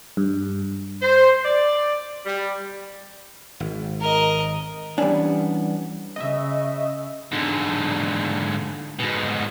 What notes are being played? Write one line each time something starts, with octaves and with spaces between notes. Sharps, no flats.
G2
C5
D5
G3
G#1
A#4 D#5
E3 G3 G#3 B3 C#4 D4
C#3 D#5 E5
G#2 D3
G#2 B2